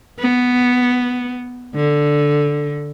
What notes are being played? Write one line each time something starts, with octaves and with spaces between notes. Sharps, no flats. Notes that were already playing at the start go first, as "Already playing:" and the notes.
B3
D3